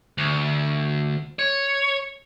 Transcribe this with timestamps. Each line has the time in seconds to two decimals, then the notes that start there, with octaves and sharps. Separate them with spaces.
0.18 D2
1.39 C#5